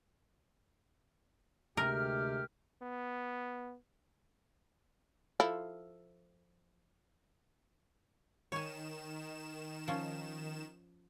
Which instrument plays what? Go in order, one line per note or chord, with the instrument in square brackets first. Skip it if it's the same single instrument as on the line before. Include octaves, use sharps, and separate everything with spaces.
[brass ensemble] D2 G#3 G4 [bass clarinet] C3 [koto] A#4 [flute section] F6
[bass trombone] B3
[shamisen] F3 E4 A4
[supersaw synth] D#3 E7 [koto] C#5 G#5
[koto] F3 C#4